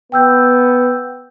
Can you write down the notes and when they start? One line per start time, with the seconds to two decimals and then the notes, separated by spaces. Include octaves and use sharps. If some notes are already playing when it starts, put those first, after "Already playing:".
0.12 B3 G5 E6 G6